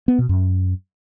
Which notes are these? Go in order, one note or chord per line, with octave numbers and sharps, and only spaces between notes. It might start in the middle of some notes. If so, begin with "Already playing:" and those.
B3
B2
F#2